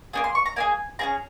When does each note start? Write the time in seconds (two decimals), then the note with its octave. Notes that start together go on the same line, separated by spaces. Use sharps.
0.13 A#3 D#4 G#4 G#5
0.24 C6
0.35 C#6
0.46 A#5
0.56 A#3 D#4 G#4 G#5
0.99 C#4 F4 G#4 A#5